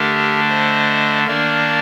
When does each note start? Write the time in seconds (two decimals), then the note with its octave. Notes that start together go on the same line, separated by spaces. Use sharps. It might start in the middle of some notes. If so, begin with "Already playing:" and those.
Already playing: D3 A3 D4 G4 A#4
0.48 C5 D#5
1.27 D#3 A#3 D4 A#4 D5